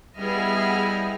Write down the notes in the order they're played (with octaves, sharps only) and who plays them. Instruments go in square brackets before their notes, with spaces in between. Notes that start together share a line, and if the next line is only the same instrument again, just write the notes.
[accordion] G3 [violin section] B3 E5 F6 [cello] E4 D#5 [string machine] G#4